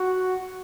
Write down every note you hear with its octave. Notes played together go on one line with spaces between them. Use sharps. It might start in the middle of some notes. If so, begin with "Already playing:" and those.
Already playing: F#4